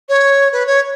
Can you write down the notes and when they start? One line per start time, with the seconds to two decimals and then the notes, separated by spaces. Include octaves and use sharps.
0.09 C#5
0.52 B4
0.67 C#5